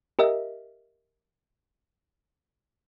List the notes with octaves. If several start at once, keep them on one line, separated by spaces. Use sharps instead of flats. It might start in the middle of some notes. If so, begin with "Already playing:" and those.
G4 A#4 D#5 E5